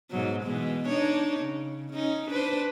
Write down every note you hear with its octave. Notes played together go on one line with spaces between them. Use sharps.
G#2 B2 F#3
B2 E3 G#3
D4 D#4 C#5
C#3
C#4 D#4
D4 B4 C5